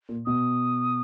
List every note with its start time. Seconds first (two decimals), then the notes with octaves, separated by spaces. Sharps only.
0.09 A#2
0.26 B2 D#6